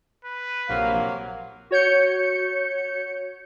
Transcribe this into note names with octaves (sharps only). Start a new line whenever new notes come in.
B4
A#1 C3 F#3 A#3 F5
F#4 C#5 G6 C#7